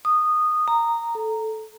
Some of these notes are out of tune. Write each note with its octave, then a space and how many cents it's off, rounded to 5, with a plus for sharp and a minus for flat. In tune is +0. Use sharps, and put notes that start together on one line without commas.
D#6 -15
A#5 -10
A4 -10